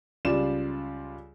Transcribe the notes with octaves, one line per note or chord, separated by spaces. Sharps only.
C#2 G3 F4 D5 E7